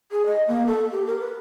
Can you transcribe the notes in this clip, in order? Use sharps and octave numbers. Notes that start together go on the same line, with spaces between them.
G#4
D#5
A#3
A4
G4
A#4
B4